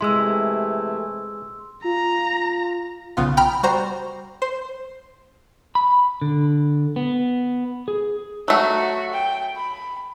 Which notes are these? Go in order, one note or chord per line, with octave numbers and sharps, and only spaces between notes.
C3 E3 G#3 A3 E4 C6 E6
F4 A#5
B1 C#3 B3 F4
G5 A#5 B5 F6 D7
G3 F#4 C5 A#5
C5
B5
D3
B3
G#4
F#3 A3 F#4
G5
B5